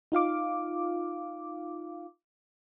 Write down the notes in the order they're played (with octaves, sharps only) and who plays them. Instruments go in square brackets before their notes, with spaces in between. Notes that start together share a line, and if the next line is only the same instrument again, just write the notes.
[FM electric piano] D#4 F4 F5 D6